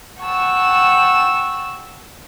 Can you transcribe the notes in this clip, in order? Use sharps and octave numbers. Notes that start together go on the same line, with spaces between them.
F#5 G5 A5 C#6 E6